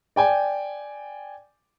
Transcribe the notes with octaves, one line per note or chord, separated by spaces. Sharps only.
D5 G5 G#5